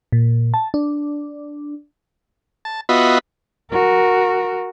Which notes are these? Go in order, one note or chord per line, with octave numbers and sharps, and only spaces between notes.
A#2
A5
D4
A5
B3 F4 F#4 D#5 E5 B5
F#4 A#4